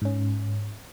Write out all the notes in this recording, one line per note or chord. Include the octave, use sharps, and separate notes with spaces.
G#2 C#4